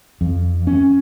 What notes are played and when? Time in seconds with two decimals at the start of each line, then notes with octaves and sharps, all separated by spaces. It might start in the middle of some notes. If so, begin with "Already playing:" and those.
0.21 F2
0.67 C#4